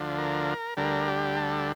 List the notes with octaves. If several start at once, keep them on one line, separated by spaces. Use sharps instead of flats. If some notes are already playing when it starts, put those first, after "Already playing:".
Already playing: D2 D3 F3
A#4
D2 D3 G3 A#4
G4
A4